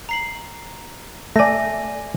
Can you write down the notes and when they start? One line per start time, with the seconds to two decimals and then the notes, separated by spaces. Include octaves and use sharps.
0.09 A#5 C7 F#7
1.36 A3 D5 G#5 A#6